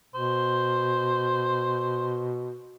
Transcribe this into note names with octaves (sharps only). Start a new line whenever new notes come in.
B2 C5